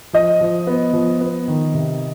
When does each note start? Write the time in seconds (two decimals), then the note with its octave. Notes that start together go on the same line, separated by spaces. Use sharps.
0.13 F3 D#5
0.41 F3
0.67 B3
0.93 F3
1.21 B3
1.48 D#3
1.74 C3